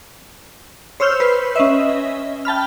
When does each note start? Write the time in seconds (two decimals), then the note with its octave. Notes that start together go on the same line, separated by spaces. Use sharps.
1.00 C5 C#5 E6 F6 G6
1.20 B4 C7
1.56 C#4 D#5 E5
2.45 G5 A5 B5 F6